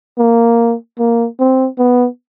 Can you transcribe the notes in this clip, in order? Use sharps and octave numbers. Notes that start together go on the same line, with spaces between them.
A#3
A#3
C4
B3